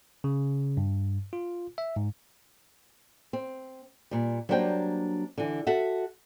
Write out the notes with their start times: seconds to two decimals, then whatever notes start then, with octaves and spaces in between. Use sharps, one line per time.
0.24 C#3
0.77 G2
1.33 F4
1.78 E5
1.96 G#2
3.33 C4
4.11 A#2 G3
4.49 F#3 G3 A#3 D4 C5 G5
5.38 D3 E3
5.67 F#4 A4 E5 F#5